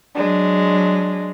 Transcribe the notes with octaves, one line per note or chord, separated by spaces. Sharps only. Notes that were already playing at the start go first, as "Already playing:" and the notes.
F#3 G#3 D4